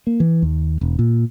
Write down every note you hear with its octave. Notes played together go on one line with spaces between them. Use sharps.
A#3
E3
D#2
E1
A#2